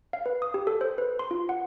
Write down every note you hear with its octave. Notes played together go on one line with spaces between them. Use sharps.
F5
B4
D#6
G4
A4
C5
B4
C6
F4
F#5